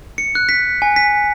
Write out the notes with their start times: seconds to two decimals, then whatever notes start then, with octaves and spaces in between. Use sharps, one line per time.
0.18 C#7
0.35 F#6
0.49 B6
0.82 G#5
0.96 B6